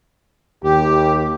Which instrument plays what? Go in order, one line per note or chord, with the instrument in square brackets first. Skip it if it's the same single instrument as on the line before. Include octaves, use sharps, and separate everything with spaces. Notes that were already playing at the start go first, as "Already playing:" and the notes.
[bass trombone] D#2 [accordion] G4